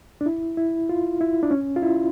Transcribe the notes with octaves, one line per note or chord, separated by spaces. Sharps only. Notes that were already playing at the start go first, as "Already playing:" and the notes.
D4
E4
E4
F4
E4
D4
C#4
F4
E4